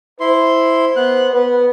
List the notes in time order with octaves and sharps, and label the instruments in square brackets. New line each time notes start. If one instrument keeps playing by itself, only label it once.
[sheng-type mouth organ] E4 C6 [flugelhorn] C5
[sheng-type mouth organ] B3 F#6
[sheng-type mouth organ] B3 [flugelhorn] B4